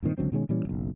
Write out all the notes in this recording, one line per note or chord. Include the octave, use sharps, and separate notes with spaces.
G2 A#2 D#3 C4
C#2 D3 F#3 C4
B2 D#3 G#3 C#4
A#2 E3 G3 C#4
F#1 B1